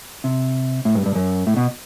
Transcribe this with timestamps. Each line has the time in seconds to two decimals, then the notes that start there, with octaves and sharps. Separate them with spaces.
0.24 C3
0.85 A2
0.95 G2
1.06 G2
1.15 F#2
1.47 A2
1.57 B2